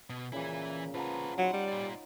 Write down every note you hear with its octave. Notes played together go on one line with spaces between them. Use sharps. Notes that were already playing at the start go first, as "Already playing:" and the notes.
B2
A#2 C#3 E3 E4
F3 F4 B4 F#5 A#5
F#3 D#4 F#5 B5 C6
G3
F4 D5